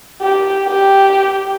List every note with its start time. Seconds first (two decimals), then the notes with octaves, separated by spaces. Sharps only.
0.22 G4
0.67 G4